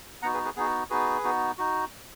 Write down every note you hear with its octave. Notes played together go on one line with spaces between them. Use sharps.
B3 D#4 F#4 F#5 A#5
G#4 B4
G#4 B4
B3 D#4 F#4 G#4
B3 D#4 F#4 G#4 B4
B3 D#4 F#4
D#4 F#4